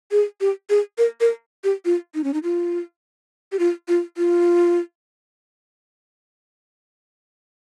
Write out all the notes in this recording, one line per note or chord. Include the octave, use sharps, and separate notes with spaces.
G#4
G4
G#4
A#4
A#4
G4
F4
D#4
C#4
D#4
F4
G4
F4
F4
F4